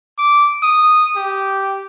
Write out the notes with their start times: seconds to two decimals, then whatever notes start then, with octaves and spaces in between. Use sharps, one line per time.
0.18 D6
0.62 D#6
1.16 G4